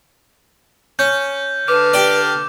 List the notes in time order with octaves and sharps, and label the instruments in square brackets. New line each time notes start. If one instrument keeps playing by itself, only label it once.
[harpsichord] C#4 [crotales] G6
[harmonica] D3 F6 [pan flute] B4 [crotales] D6
[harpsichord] G4 D5